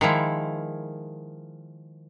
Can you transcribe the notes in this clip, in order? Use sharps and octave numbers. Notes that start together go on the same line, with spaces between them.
D#3 F3 G#3 E4